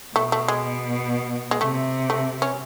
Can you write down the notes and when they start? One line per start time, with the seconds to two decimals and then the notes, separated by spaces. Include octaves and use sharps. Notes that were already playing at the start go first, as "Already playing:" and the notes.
0.16 B2 A3
0.32 A3
0.48 G#3
1.51 G#3
1.61 C3 A3
2.10 A3
2.42 C#4